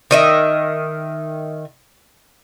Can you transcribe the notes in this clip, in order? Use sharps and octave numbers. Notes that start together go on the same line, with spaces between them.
D#3 D#5 E5